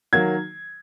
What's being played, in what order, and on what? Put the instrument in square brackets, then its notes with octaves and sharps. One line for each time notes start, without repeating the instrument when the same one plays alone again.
[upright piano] D#3 F#3 A#3 G#6